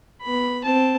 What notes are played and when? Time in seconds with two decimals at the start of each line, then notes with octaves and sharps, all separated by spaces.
0.22 B3 B5
0.64 C4 A5